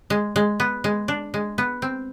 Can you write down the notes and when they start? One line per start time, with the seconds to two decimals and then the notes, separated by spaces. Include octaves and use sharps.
0.10 G#3
0.36 G#3
0.60 B3
0.84 G#3
1.08 D4
1.34 G#3
1.58 B3
1.82 C4